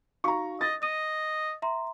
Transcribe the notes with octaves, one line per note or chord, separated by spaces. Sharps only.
D#4 F#4 F5 A#5 C#6
D#5 A6
D#5 D#6 D#7
E5 A#5 C6